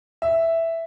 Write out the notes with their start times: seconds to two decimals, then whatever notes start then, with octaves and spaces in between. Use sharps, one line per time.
0.22 E5